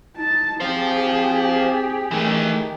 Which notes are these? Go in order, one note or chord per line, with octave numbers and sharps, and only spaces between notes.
D#4 A5
C4 G4 G#4 C5 F5
D#3 E3 A3